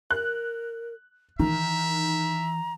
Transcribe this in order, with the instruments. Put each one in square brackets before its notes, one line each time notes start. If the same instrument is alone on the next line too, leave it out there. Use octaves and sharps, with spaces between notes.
[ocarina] A#4 [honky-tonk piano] F#6
[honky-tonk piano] D#3 [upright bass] E3 [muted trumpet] E5 [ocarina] A#5